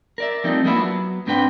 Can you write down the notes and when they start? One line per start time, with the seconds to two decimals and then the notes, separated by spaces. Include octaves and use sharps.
0.18 A#4 D5 E5
0.44 F3 G3 A3 C4 D#4
0.65 G#3 A#3 B3 D4 E4 F4
0.79 F#3 B3
1.27 G#2 C4 D4 B4 G5 C6